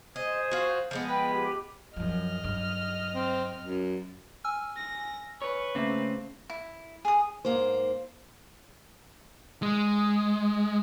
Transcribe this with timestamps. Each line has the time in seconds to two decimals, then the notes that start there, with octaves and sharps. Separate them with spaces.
0.16 G#4 C5 D#5
0.51 F4 F#4
0.91 F3 G#3 B3
1.08 B4 G5
1.33 G4
1.96 F#2 F3 D#5 F6
2.44 G2 F#3
3.15 C4
3.61 F#2
4.44 G#5 E6 F6
4.77 A#6
5.42 B4 C#5
5.75 C#3 A3 A#3 C4
6.50 E4
7.05 G#4 D#6
7.45 G#2 A#3 C5
9.62 G#3